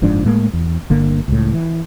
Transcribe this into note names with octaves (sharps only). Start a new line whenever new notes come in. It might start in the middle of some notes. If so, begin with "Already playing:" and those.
F#1 G#2 F3 D4
A2 G#3 A#3
E2
G1 D3 A#3
C#2 A2
E3